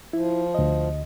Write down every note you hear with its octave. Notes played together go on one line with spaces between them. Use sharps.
F3 E4
D2 D#5